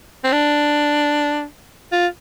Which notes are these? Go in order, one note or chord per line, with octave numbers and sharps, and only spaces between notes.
C4
D4
F4